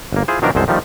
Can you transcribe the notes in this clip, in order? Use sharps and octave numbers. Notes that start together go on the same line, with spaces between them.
G1 A#3
E4 F4 G#4 C5
B2 D#3 F3 F#3 D4 A#4
C2 F#2 G#3 A4 C5
D#3 F3 G3 A3